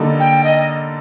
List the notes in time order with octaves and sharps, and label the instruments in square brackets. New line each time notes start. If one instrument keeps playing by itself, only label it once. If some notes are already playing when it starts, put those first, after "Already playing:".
Already playing: [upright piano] D3 G3 A#3 D#4 A4
[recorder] G5
D#5